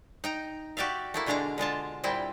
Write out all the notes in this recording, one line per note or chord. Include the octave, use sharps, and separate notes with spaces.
D#4 G5 A#5
F#4 G4 D5 E5 F5
A3 A#3 E4
B2 D3 G#3 D4 F5 A#5
D3 G#3 F4 A5
A#2 G3 C4 E4 G5